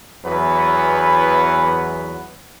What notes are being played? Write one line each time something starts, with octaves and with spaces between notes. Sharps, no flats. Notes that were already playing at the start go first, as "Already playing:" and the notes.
E2 E3 F#3 B3 B4